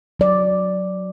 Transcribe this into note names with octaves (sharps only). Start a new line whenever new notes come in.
F#3 D5